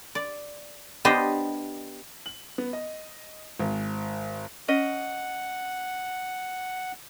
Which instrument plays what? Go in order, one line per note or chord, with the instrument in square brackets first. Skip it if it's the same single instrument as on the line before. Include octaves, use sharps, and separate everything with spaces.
[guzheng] D5
B3 D4 G4 C5 D#5
[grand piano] F#7
B3
D#5
G#1
[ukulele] C#4 D#5 [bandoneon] F#5